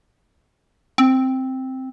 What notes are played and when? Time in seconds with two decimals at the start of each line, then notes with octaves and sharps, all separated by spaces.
0.98 C4